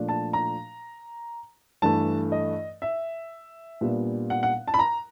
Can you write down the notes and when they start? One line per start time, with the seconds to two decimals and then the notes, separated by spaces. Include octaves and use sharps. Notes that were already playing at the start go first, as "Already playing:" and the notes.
Already playing: A#2 F3 A3 D4
0.09 A5
0.33 A#5
1.82 G2 E3 A3 A5
2.32 D#5
2.82 E5
3.81 A#2 G3 B3 D4
4.30 F#5
4.43 F#5
4.68 A5
4.74 B5
4.79 A#5